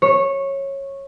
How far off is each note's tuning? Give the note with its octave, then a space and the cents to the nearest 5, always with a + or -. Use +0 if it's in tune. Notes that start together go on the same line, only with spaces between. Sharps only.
C#5 -15